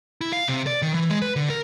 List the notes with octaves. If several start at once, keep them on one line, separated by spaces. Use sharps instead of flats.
E4
F5
C3
D5
D#3
E3
G#3
B4
D3
A#4